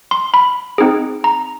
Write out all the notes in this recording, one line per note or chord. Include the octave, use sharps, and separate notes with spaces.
C6
B5
C4 D#4 G#4
A#5